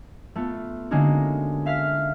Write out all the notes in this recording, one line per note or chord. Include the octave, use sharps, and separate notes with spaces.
A3 B3 F4
D3 G#3 A#3 C#4 D#4 F#4
E5 F5 F6 B6